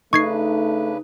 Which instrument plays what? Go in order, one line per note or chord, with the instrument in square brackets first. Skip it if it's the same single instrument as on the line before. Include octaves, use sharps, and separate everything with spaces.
[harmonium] C#3 D4 B4 [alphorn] A3 [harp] D#4 [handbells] C#6 G#6 C7